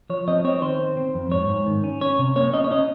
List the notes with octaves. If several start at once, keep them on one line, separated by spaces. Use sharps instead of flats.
F3 C#5
C4 D#5
C4 C#5
D#3 C5
C4
C4
F2
G#2 C#5
G#2
D#3
C#4
C#4 C#5
C3
A#3 C#5
C#4 D#5
C#5
C#4 D#5